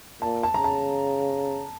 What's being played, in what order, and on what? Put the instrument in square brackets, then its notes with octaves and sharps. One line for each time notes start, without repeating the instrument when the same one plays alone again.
[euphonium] A#2 [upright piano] A5
[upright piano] A5
[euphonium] C#3 [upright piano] A#5
[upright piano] A5